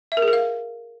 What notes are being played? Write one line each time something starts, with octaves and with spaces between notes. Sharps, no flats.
E5
A#4
G#4
A#4
F5